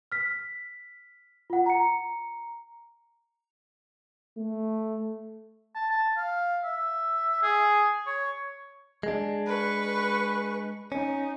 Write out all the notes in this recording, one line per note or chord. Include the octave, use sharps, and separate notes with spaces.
F6 B6
F4 F#5
A#5 C#7
A3
A5
A5
F5
E5
G#4
C#5
G#3 D4
B4 C#6
C#4 D#4